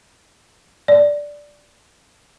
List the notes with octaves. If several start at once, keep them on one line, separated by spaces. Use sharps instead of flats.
D5